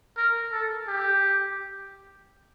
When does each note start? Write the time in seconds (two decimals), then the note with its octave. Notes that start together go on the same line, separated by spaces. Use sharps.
0.17 A#4
0.52 A4
0.88 G4